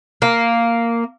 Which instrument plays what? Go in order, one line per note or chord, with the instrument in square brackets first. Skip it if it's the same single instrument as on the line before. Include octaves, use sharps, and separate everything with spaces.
[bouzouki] A#3